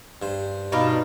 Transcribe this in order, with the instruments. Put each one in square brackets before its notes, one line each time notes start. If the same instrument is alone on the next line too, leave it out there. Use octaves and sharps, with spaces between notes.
[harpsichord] G2 C5
[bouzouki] B2 D4 F4 [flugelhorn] D#4